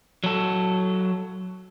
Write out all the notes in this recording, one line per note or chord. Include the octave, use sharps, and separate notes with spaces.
F#3 A4